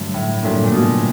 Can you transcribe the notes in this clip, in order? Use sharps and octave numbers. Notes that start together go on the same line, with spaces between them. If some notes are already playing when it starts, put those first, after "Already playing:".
Already playing: G2 D3 F#3 A3
A2
G2 A#2 D3 F#3 A3
A#2
B2